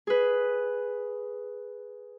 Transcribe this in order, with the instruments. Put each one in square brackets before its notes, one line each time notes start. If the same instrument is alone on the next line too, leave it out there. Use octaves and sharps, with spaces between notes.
[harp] G#4 B4